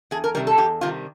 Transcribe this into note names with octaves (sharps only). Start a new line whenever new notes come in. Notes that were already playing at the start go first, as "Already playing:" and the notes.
E2 G#4
A#4
C3 D#3 G3 A#4
A4
E2 G4
C3 D#3 G3 F4